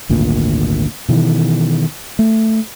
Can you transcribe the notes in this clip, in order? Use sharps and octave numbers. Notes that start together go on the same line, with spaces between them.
G#1 D2 A#2
B2 D#3 E3
A3